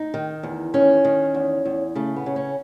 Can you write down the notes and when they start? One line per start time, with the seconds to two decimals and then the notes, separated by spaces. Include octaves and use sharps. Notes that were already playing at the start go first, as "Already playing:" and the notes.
Already playing: D#4
0.14 D#3
0.43 E2
0.74 D#3 C#4
1.05 D#3
1.34 E2
1.65 E2
1.95 C#3 A3
2.16 B3
2.26 C#3
2.36 C#4